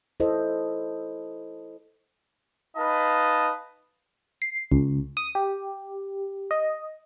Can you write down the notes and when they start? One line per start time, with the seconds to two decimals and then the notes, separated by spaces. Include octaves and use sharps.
0.20 E4 A4 C5 D#5
2.77 D#4 B4 D#5 F5 A5
4.42 C7
4.72 C#2
5.17 D#6
5.35 G4
6.51 D#5